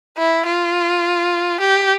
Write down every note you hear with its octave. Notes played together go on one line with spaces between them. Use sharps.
E4
F4
G4